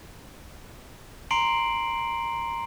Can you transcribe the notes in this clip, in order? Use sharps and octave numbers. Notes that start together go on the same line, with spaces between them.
A#5 C6 C7 D7 F#7